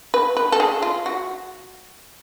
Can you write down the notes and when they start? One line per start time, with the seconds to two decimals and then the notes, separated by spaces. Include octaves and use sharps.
0.14 B4
0.37 B4
0.52 A4
0.60 G#4
0.83 F4
1.06 F#4